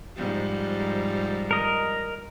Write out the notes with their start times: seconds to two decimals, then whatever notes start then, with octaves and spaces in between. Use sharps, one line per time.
0.16 G#2 F3 G3
1.51 A#4 D#5